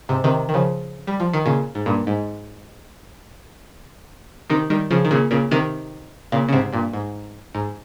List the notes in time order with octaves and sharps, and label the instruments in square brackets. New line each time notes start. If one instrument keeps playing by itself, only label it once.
[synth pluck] G#2 C3
C3 D#3
D#3
C#3 F3
G3
F3
D#3
A#2 C#3
G#2
G2 A#2
G#2
C3 D#3
D#3 G3
C#3 F3
D#3
A#2 C#3
A#2 C#3
C3 D#3
A#2 C#3
C#3
G#2 C3
G2 A#2
G#2
G#2